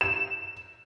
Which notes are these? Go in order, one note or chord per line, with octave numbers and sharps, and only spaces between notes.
E7